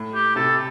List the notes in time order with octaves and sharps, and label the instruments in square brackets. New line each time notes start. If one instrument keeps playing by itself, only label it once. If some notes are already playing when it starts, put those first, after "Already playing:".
Already playing: [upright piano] A2
[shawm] G4
[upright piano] C3 [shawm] A4